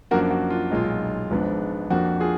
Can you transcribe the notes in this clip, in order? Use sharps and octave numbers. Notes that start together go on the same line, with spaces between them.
F#2 F3 A#3 D4 F#4 A#4
F#4
F4
B1 A#2 G#3 D#4 F4
G#1 G#2 F3 B3 D4
F2 F3 A#3 D4 F#4
F4 G#4